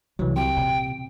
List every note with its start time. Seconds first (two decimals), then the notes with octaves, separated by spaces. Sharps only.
0.19 C2 E3 F#3
0.36 C3 G5
0.57 A#2